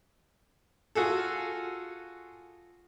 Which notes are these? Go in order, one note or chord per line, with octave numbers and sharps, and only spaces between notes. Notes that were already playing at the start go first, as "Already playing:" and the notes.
F4 F#4 G#4 A4